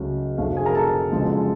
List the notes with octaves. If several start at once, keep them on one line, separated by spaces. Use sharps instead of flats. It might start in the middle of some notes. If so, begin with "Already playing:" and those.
Already playing: C#2 C#3 F#3 A3
F1 F2 D3 F#3 A3 F5
G#4 G#5
A#4 A#5
A4 A5
F#1 F#2 D3 F3 G#3